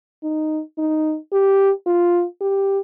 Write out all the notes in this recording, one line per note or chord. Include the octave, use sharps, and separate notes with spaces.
D#4
D#4
G4
F4
G4